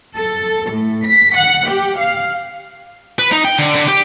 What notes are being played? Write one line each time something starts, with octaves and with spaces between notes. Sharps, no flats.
A4
A2
B6
F#5
G4
F5
B4
D#4
G5
D3
D3
G4